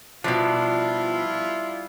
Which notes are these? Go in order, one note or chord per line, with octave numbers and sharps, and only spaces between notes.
B2 F3 G3 D4 E4 F4